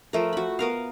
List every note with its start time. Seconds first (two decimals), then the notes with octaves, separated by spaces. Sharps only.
0.13 F3 A3 A#4
0.33 F#4 B5
0.59 B3 A#4 F5